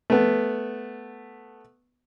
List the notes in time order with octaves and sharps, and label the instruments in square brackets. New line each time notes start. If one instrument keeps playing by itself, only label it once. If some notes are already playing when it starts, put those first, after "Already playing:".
[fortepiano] A3 B3